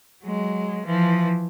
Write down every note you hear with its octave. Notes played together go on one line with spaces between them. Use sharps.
F#3 G#3
E3 F3